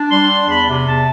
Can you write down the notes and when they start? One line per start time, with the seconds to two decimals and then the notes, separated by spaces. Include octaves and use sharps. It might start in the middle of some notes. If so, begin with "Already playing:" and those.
Already playing: D4
0.11 G3 C6
0.30 D4
0.49 E2 B5
0.68 C3
0.87 E2 A5